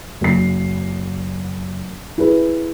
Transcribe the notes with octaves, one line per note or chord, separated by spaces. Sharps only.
F#1 C7
E4 G#4 B4